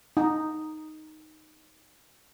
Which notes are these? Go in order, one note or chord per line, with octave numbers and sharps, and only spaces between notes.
D#4